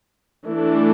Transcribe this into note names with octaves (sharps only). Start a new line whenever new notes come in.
E3 A3 D4